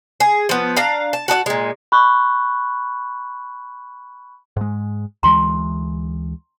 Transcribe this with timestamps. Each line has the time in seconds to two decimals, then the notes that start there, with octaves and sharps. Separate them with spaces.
0.20 G#4
0.49 F3 B3
0.77 D4 F5 A#5
1.13 A5
1.28 F#4 A4 D#5 F#5
1.46 A#2 G#3
1.92 B5 C#6 F#6
4.57 G#2 G#3
5.23 D2 E3 G#3 A#5 C6